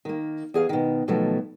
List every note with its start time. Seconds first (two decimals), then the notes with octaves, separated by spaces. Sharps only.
0.05 D#3 A#3
0.54 E2 G#4 F5
0.69 B2 D#3
1.08 B2 D#3 F3 F#3 A3